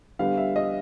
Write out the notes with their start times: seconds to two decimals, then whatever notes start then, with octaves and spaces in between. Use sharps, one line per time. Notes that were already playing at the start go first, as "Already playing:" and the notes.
0.19 D3 G3 B3 F5
0.37 E5
0.56 D#5